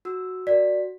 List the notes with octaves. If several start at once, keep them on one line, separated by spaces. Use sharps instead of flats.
F#4 E6
F#4 A#4 D5 B6